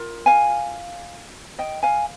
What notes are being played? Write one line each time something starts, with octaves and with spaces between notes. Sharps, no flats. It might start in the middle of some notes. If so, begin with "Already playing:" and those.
Already playing: F4 A#4
F5 G#5
D#5 G5
F5 G#5